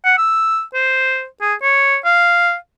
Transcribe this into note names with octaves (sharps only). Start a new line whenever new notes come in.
F#5
E6
C5
G#4
C#5
F5